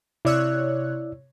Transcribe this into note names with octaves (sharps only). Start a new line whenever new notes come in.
C3 E4 C#5 D5 E6 F#6